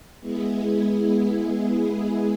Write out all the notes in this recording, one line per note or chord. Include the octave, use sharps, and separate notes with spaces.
G#3 B3 E4 G#4